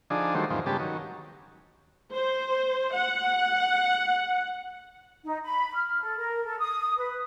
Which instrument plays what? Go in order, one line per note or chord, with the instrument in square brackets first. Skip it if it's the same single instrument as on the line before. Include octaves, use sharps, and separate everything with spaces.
[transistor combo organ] D3 F3 D4 D#4 G#4
D#3 F#3 G3 A3 C5
E2 G#2 D#3 F3 C4
G2 C#3 G#3 B3 G4 A5
D#3 F#3
[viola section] C5
F#5
[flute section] D#4
B5
F6
A4
A#4
A4
D#6
B4